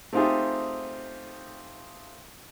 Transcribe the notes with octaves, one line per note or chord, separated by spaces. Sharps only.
A3 C4 D#4 F4 G4 G#4